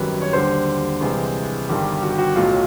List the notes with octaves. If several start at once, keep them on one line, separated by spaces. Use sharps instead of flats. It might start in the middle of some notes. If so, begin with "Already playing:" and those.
Already playing: G#1 F#2 D#3 G3 B4
C#5
D#2 D3 G3 C5
C2 C3 E3 G#3
G1 G2 D#3 G3 G4
F#4
G4
F#4
B1 A2 F#3 F4